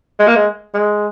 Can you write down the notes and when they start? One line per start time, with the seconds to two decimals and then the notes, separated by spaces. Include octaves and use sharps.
0.19 G#3
0.27 A#3
0.36 G#3
0.74 G#3